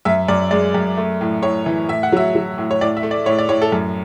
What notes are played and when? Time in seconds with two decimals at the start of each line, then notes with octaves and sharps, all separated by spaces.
0.05 F#2 E5
0.28 F#2 D5
0.51 G#3 D5
0.74 F#2
0.97 A3
1.21 A2
1.43 A2 C#5
1.66 E3
1.88 A2 E5
2.03 F#5
2.12 F#3 E5
2.35 F#3
2.58 A2
2.71 C#5
2.81 A2 D5
2.97 E5
3.03 A3
3.11 D5
3.26 A2 C#5
3.39 D5
3.49 A2 C#5
3.62 A4
3.72 F#2